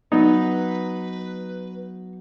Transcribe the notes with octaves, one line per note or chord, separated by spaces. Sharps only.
F#3 B3 D#4 B4